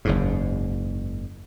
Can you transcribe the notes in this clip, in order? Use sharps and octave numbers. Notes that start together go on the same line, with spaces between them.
F#1 E2 G#2